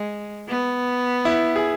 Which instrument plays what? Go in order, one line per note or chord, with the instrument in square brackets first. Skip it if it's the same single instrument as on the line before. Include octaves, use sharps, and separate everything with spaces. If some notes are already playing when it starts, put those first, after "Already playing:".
Already playing: [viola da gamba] G#3
B3
[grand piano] E4
G#4